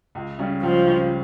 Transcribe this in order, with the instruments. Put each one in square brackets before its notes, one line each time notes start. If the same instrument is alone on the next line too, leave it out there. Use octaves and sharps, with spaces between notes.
[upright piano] C#2
C#3 G3 C#4
[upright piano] C#2 [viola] F3
[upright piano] C#3 G3 C#4